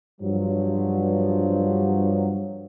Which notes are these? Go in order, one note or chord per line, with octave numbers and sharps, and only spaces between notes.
G2 F3 F#3